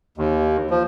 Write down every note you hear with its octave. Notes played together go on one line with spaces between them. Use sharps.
D#2
F3